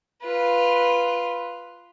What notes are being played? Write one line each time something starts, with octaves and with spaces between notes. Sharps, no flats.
F4 B4